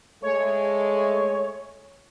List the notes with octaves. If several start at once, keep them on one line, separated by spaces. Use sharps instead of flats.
G#3 A3 C#5